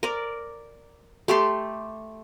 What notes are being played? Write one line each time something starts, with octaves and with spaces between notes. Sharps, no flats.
A#4 D5
A3 G4 A4 C6